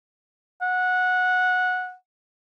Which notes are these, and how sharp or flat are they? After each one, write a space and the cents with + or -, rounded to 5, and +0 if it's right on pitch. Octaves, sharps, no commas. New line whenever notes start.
F#5 -15